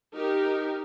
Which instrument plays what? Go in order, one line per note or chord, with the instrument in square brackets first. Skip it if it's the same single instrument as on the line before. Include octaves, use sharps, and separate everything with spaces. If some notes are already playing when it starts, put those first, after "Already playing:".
[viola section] D#4 G4 A#4